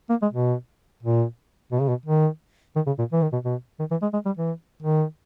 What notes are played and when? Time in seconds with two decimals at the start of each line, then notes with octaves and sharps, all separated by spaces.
0.10 A#3
0.22 G#3
0.33 B2
1.03 A#2
1.72 B2
1.81 C#3
1.89 B2
2.06 D#3
2.76 D#3
2.87 C#3
2.98 A#2
3.13 E3
3.22 D#3
3.32 B2
3.45 B2
3.79 D#3
3.91 E3
4.02 G#3
4.13 G#3
4.26 G3
4.37 E3
4.82 D#3